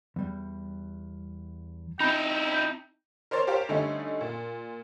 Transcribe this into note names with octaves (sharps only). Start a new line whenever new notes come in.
E2 G3
C4 D#4 E4 G5 A#5 B5
A#4 C5 C#5 C6 A6
G4 A#4 C5 C#5 F5 G5
D3 G3 A3 C#4 D#4
A#2